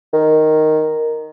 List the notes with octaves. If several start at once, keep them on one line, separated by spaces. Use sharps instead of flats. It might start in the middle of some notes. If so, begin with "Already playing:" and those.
D#3